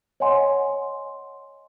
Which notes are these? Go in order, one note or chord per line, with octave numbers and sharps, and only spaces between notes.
C#5 D#5 F#5 G#5 C6